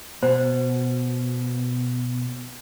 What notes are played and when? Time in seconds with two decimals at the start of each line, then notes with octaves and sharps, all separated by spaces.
0.23 B2 C5